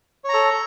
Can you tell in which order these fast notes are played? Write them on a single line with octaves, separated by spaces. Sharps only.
C#5 A#5 A4